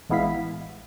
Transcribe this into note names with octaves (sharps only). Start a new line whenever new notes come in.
A1 G#3 B3 E4 F5 B6